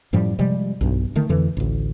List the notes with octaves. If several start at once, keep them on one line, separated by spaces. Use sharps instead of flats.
F#2 A2 F3 G3
C3 F3 G3 G#3
B1 G2
D3 D#3 A3
F2 D3 E3
A1 D2